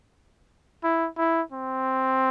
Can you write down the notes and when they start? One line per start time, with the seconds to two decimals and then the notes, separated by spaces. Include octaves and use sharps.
0.84 E4
1.17 E4
1.52 C4